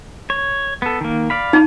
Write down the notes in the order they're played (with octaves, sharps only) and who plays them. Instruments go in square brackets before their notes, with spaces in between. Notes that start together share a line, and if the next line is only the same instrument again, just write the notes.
[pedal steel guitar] C#5
B3 A4
D#3 A#3
D5 F5 B5
[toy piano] D#4 A5